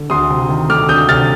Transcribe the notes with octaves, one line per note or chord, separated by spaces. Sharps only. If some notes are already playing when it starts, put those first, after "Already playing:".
Already playing: D3
D2 C6 D#6
C3
D#3
A3 D6 F6
D2 D#6 G6
C3 F6 A6